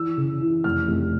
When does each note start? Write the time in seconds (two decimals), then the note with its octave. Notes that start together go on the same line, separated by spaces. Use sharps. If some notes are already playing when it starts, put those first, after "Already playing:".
Already playing: E3 E6
0.17 C#3
0.41 E3
0.64 F1 F6
0.88 F1